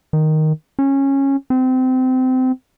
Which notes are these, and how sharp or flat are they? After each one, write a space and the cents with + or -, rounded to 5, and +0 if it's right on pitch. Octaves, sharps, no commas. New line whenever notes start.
D#3 +0
C#4 -15
C4 -25